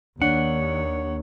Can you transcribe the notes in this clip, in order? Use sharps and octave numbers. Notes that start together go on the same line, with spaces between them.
D#2 D4 C#5 F#5